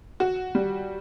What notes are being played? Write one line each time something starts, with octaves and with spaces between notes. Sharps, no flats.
F#4
G3